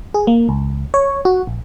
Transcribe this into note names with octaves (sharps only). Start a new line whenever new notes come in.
G#4
A#3
C#2
C#5
F#4
A#1